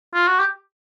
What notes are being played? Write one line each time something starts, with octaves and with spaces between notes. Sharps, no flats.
F4
F#4
G4